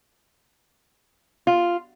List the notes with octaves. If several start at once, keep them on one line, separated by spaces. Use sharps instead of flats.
F4